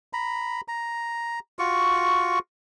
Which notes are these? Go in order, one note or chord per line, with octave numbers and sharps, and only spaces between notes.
A#5 B5
A#5
F4 F#4 C#6